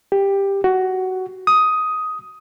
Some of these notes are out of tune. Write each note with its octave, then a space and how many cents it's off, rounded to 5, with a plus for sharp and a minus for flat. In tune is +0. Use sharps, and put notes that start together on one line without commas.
G4 +10
F#4 +15
D#6 +10